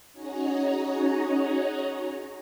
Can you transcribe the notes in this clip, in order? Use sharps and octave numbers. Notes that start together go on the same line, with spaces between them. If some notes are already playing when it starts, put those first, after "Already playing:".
C#4 D#4 F#4 G#4 C#5 A#5